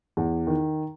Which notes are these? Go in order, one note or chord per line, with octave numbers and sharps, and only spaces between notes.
E2
D#3